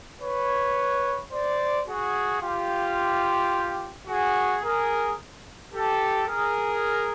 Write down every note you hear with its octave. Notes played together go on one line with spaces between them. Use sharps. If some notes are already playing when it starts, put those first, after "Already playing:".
B4 C#5
C5 D5
F#4 G#4
F4 G4
F#4 G#4
G#4 A#4
G4 A4
G#4 A#4